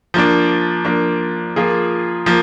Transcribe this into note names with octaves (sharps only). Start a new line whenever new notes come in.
F3 A#3 D4
F3 A#3 D4
F3 A#3 F4 G#4
F3 A#3